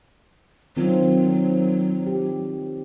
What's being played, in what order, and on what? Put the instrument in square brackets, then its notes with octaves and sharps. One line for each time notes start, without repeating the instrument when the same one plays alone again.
[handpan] D#3 C4 F4 [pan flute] F#3
[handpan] G4